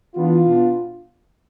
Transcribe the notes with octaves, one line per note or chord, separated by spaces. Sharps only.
E3 B3 D4 F4
B2 B3 D4